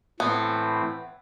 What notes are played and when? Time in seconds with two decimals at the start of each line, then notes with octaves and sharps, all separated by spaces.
0.20 A2 E3 A3 B3 C4